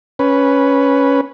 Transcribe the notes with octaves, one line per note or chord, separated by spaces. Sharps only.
C#4 B4